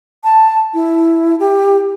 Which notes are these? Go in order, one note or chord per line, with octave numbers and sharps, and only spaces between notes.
A5
E4
G4